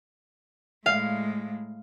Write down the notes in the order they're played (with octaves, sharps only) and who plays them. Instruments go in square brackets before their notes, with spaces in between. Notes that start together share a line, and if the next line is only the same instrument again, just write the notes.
[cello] A2 G#3 [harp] F5